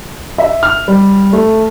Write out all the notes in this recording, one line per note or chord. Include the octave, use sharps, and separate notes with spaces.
E5
F6
G3
A3